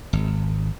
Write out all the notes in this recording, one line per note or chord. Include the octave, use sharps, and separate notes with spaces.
G#1